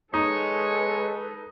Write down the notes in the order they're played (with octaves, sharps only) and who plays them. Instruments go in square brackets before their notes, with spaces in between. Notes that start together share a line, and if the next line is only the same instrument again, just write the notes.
[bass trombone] G#3 [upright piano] D#4 [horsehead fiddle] A4 B4 [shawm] C#5